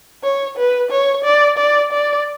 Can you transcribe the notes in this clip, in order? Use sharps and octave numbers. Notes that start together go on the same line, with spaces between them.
C#5
B4
C#5
D5
D5
D5